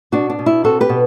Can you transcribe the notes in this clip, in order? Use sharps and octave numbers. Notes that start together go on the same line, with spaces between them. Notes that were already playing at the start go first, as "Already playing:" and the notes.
B2 D4 F#4
D4
B2
E4
C4 F#4 A4
G4 B4
B2